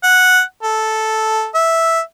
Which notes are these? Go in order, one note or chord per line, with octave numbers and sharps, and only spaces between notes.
F#5
A4
E5